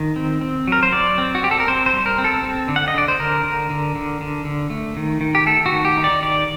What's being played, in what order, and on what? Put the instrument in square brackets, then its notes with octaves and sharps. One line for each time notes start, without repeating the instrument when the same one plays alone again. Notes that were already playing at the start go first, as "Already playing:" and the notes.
Already playing: [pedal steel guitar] D#3
C4
C4
F#3 A#4
C5
F#3 D5
C4
F#4
C4 G4
A4
A#4
C4 C5
C5
G3
A#4
C4
A4
C4
D3
F#5
D#5
D3 D5
C5
D3 A#4
D3
D3
D3
D3
D3
A3
D#3
D#3
G4
A3 A4
F#4
D#3
G4
D#4
D5
D#3 D5